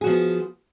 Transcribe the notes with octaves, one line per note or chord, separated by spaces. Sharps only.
F3 B3 F#4 G#4